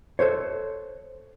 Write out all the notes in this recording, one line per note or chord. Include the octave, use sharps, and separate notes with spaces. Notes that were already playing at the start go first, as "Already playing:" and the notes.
A4 A#4 C5 C#5